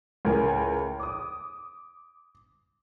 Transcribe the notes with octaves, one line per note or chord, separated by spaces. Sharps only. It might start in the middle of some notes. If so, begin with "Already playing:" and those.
C#2 A2 A#4 G#5
D6 D#6